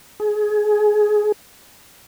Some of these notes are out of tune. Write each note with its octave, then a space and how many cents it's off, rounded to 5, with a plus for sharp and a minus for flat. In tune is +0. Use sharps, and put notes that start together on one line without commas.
G#4 +20